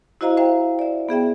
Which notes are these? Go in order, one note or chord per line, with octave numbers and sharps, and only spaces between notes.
E4 F#4 C5 D#5 F5 A#5
C5 E5 F5 G5 A#5
D5 E5
B3 G#4 E5 G5